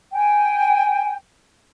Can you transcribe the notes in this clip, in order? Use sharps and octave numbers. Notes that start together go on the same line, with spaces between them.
G5 G#5